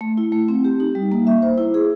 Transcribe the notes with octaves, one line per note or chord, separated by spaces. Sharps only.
A3
E4
A3
C4
G4
D#4
G3
A#3
E5
C5
E4
G#4